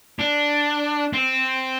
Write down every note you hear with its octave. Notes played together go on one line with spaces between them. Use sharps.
D4
C4